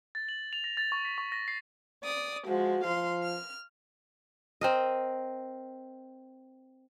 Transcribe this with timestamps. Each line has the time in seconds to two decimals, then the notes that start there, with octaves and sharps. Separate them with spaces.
0.15 A6
0.29 F#7
0.53 F7
0.64 A#6
0.77 A6
0.92 C#6
1.05 B6
1.18 C#6
1.32 A#6
1.48 C7
2.04 D5 D#6
2.46 F3 G#3 F#4
2.85 F3 F5 C6
3.23 F6
4.61 C4 A#4 D#5